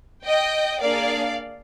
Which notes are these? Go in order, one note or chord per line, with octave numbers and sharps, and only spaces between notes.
D#5 G5
A#3 D4 G#4 D5 F5